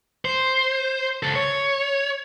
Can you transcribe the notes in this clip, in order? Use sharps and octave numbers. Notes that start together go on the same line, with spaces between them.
C5
C#2 A4
C#5